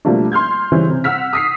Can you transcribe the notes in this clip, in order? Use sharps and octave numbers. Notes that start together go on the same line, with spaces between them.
B2 F3 G3 A3 A#3 D4
C6 F6 G6 G#6
C#3 E3 G3 C4 C#4
C3
F#5 E6 F6 B6
D#6 B6 C7